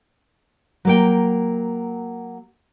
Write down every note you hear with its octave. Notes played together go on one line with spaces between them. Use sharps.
F#3 A#3 G5